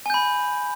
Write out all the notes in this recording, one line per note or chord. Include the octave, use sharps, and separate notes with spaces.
G#5 B5 G6